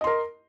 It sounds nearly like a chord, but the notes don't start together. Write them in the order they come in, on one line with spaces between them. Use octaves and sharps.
D#5 C6 A#4